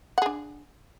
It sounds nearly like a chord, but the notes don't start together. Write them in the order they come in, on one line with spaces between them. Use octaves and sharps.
F#5 G#4 D4